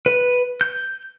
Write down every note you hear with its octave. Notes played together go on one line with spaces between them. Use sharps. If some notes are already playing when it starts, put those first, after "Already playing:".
B4
G6